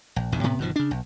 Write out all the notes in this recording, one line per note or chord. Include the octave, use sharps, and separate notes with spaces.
A#1
A#1 E2 G2 D#3
A2 C3 B3
G1 B2 D#3 F3
C#3 D4
B1